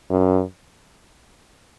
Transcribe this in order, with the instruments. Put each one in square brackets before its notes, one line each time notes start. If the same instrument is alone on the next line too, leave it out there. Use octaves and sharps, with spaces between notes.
[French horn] F#2